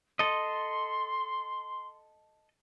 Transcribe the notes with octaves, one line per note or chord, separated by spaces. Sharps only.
A4 D#5 C6